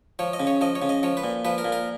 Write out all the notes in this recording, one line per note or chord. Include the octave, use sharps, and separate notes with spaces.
F3 C#5
D#5
C#3
C#5
F3 D#5
C#5
C#3
D#5
F3 C#5
B4
A#2
F3 B4
A#4
A#2
A#4